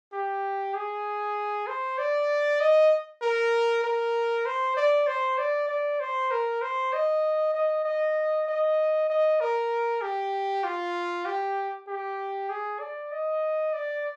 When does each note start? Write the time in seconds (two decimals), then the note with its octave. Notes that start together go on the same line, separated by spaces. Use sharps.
0.13 G4
0.75 G#4
1.67 C5
1.98 D5
2.60 D#5
3.22 A#4
3.84 A#4
4.46 C5
4.77 D5
5.07 C5
5.38 D5
5.69 D5
6.00 C5
6.31 A#4
6.62 C5
6.93 D#5
7.54 D#5
7.85 D#5
8.48 D#5
9.10 D#5
9.40 A#4
10.02 G4
10.64 F4
11.25 G4
11.88 G4
12.50 G#4
12.80 D5
13.12 D#5
13.73 D5